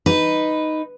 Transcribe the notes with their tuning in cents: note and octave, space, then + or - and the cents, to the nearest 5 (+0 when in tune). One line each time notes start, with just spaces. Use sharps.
D#4 +0 B4 +0